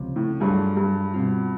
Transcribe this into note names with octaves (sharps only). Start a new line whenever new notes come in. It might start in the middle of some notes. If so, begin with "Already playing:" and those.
Already playing: C#2 C3 F3
A2
G2 F#3 A3 D4 F4 G#4
G2
B2 G3 C4 F4